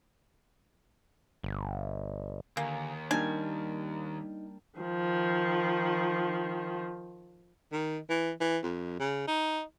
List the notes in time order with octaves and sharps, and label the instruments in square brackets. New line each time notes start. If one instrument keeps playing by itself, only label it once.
[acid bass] G1
[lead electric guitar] D#2 [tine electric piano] D3 G#5 [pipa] A#3
[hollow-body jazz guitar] G3 A#3 D4 [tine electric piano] D#4 [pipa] G#5
[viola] D#3 F3
[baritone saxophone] D#3
E3
E3
F2
C#3
D#4